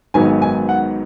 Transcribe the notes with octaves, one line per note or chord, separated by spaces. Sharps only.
G#1 G#2 D#3 F#3 B3 G#5
G#5
F#5